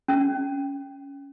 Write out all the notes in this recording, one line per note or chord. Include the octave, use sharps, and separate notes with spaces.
C#4